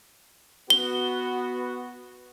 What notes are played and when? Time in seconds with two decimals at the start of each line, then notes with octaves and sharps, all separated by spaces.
0.70 B3 F#4 G7